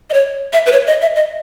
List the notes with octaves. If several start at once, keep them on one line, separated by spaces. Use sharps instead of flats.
D#5
C#5
E5
B4
C#5
D#5
E5
D#5